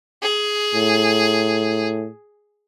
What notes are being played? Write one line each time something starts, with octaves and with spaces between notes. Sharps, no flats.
G#4
A2